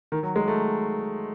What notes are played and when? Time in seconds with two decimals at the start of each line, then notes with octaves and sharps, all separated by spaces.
0.12 D#3
0.23 F#3
0.36 G#3
0.48 A3